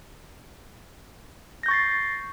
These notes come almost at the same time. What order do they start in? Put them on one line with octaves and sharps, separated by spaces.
A#6 G6 C#6 A6 C7